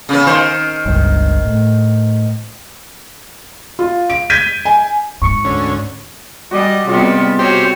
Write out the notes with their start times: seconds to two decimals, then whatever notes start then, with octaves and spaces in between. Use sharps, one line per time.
0.09 C#3 B3
0.27 D#3 C5
0.86 G1 C#2 G2
1.45 A2
3.79 F4
4.10 D7
4.30 G6 G#6 B6 D#7
4.65 G#5
5.22 G#2 C#6 C#7
5.44 D2 C#4
6.51 G3 F#4 D5 D#5 G#5
6.87 C3 G3 G#3 B3 C#4 F4
7.39 F#4 G4 C5 C#5